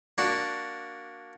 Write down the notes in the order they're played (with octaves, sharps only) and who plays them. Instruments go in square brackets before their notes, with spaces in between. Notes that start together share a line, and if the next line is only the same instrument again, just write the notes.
[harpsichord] A#3 D4 F#4